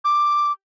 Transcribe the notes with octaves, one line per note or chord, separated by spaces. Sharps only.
D6